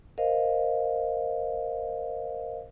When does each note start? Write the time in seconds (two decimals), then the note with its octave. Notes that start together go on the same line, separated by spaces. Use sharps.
0.18 A#4 C5 D#5 F5